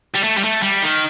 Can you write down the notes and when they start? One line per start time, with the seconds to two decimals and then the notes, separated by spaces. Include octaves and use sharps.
0.15 G3
0.24 A3
0.38 G3
0.44 A3
0.63 G3
0.82 D#3